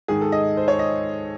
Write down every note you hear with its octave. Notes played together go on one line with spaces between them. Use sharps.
G#2 D#3 G#4
A4
D#5
C5
C#5
D#5